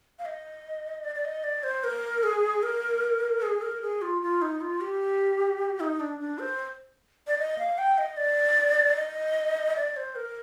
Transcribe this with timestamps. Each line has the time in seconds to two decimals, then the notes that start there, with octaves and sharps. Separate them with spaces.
0.19 F5
0.25 D#5
1.04 D5
1.15 D5
1.25 D#5
1.44 D5
1.63 C5
1.84 A#4
2.23 G#4
2.63 A#4
3.42 G#4
3.62 A#4
3.82 G#4
4.02 F4
4.22 F4
4.42 D#4
4.61 F4
4.81 G4
5.80 D#4
6.00 D4
6.20 D4
6.39 C5
7.27 D5
7.38 D#5
7.59 F5
7.78 G5
7.98 D#5
8.17 D5
8.96 D#5
9.76 D5
9.96 C5
10.16 A#4